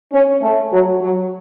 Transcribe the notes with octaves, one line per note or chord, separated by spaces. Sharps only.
C#4
A3
F#3
F#3